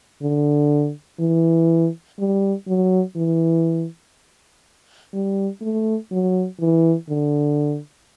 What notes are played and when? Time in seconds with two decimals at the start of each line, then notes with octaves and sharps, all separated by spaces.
0.22 D3
1.20 E3
2.19 G3
2.68 F#3
3.16 E3
5.14 G3
5.62 A3
6.11 F#3
6.61 E3
7.09 D3